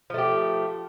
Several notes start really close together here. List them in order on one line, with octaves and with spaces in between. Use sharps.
F3 A3 G4